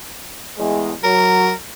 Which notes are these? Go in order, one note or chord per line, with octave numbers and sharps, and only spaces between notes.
E2 A2 G#3
F#3 A#4